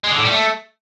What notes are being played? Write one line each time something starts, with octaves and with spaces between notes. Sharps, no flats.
G#3
D3
A2
G3
A3